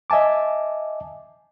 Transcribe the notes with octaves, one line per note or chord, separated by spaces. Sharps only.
D#5 E5 G#5 A5 D6